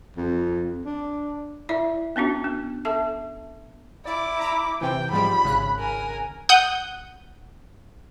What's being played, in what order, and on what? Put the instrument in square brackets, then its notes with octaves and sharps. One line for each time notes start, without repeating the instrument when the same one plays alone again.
[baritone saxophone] F2
D4
[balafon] E4 D5 E5
B3 C#4 D4 F#4
B3
A4 E5 A5
[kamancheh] E4 D6 [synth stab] D5
[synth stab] A#5 B5
[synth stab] C3 E3 [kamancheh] G5
[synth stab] G#2 F3 G3 [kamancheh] B5
[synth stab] G#1 C#3 F#6
[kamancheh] A#4 G#5
[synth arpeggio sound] F#5 D#6 G6